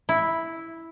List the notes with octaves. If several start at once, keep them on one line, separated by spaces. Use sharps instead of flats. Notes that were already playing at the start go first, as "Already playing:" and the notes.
E4